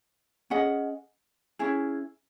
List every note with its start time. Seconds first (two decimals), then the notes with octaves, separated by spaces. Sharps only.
0.50 C#4 G#4 D#5 F#5
1.59 C#4 E4 G#4